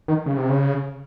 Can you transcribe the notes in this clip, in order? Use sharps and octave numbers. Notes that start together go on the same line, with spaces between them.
D#3
C#3
C3
C#3